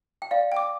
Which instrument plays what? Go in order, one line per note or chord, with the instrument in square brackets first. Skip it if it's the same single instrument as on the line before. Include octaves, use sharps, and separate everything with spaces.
[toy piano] G5
[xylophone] D5 [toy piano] F5
[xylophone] G5 D6